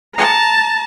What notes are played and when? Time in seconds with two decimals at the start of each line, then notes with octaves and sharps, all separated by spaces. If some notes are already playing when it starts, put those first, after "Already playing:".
0.14 A5 A#5